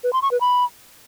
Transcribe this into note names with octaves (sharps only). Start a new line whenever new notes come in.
B4
C6
C#6
B4
B5